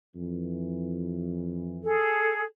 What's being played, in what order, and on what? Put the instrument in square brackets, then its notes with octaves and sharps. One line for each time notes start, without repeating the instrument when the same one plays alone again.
[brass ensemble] F2 E3
[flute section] G#4 A4